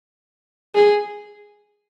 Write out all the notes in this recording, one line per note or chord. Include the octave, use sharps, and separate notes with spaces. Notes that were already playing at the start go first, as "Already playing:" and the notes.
G#4